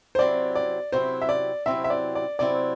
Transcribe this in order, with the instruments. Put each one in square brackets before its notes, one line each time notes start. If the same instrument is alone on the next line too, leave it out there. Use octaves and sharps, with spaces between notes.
[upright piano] C5
[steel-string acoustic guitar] C3 F#3 C4 E4 [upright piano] D5
[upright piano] D5
[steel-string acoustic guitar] C3 F#3 C4 E4 [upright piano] C5
[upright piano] E5
D5
[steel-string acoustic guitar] C3 F#3 C4 E4 [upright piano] E5
[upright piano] E5
D5
D5
[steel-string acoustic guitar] C3 F#3 C4 E4 [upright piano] D5